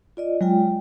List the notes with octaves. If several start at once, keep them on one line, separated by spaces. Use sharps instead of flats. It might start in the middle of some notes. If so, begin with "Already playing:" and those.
F4 D5 D#5
F#3 G#3 F4 G5